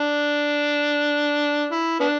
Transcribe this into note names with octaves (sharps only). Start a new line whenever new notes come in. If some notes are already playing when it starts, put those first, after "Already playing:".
Already playing: D4
E4
B3 D4